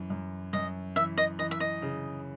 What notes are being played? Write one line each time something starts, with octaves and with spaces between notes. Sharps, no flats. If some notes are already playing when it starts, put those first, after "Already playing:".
Already playing: F#2 E3
F#2
F#2 D#5
E3 E5
D#5
E3 D#5
E5
D#5
C#3